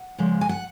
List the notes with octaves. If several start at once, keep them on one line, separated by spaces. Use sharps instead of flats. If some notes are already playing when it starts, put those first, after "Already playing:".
Already playing: F#5
C#3 F3 G#3
G#5
F#5